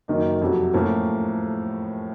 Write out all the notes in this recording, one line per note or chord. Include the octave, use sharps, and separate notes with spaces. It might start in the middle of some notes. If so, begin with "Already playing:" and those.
F#1 F#2 D#3 A#3 D#4
F2 C3 F#3
A2 F3 A#3 C#4